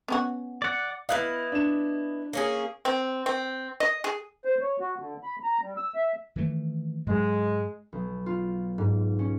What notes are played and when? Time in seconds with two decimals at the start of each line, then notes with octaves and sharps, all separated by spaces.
0.08 B3 C#4 F#4
0.62 D5 F#5
1.09 B3 E4 D#5 F5 F#6
1.52 D4 E7
2.33 A#3 C#4 G#4
2.85 C4
3.26 C4
3.80 D#5
4.04 G#4
4.45 C5
4.61 C#5
4.80 F#4
4.99 D3
5.23 B5
5.43 A#5
5.62 G3
5.77 E6
5.95 E5
6.36 D#3 E3 A3
7.07 G#2 F#3 G#3
7.93 B1
8.26 F4
8.78 G#2
9.19 C#4